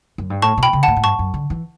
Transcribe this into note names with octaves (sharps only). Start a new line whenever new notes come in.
F#2
G2
A2 A5 C#6
B2
G5 B5
C#3
A2 F#5 A5
A2
G2 A5 C#6
F#2
D3
E3